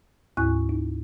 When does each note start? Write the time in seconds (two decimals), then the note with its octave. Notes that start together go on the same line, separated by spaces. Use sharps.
0.37 D2 G#2 E4 G#5 C#6 F#6
0.69 D#4